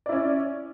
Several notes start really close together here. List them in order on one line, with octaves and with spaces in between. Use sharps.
D5 E4 C#4